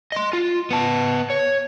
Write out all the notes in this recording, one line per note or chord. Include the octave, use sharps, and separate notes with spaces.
D#5 C6
F4
B3 A5
C#5